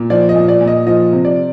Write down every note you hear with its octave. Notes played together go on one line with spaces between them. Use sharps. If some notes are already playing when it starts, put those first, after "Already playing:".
Already playing: A#2
F3 D5
D#5
A#2
D5
A#2
D#5
F3 D#5
C3
D5